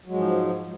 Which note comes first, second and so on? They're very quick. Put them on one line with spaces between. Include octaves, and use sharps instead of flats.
F#3 G#3 G#2 F3